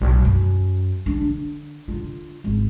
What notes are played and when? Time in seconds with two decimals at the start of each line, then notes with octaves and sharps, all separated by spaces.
0.01 B1 A2
0.25 F#2
1.06 D#3 D4
1.21 D3
1.88 D3 F4
2.44 G#1